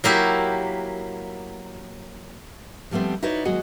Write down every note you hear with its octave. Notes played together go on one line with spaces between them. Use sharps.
F#3 A#3 E4 G4
F3 G3 A3 B3 C4
D#4 E4 F#4 B4 C#5 D5
D#2 F#3 G#3 F#4 D#5